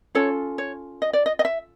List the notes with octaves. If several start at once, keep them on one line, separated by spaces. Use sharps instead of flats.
C#4 F4 A4 C#5
C#5
D#5
D5
D#5
D#5
E5